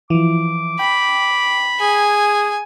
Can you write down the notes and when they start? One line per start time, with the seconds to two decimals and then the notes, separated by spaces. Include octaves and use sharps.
0.10 E3 F3 D6
0.79 G5 B5
1.80 G#4 G#5